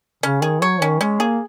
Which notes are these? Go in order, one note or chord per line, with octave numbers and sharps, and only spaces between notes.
C#3 C#4
D#3 G#4
F#3 C#5
D#3 C#4
G#3 C#4
A#3 G#4